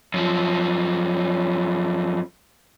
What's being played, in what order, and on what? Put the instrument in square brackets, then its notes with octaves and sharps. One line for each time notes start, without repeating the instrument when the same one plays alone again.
[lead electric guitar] F#2 F3